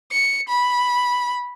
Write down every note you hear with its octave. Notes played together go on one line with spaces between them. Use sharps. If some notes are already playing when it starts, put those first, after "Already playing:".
C#7
B5